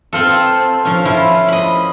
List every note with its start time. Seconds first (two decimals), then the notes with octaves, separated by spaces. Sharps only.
0.13 C4 F4 A4
0.85 F3 C#4
1.05 F3 C#4 E4
1.48 D#5 B5